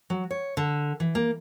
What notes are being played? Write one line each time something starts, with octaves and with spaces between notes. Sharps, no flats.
F#3
C#5
D3
E3
A#3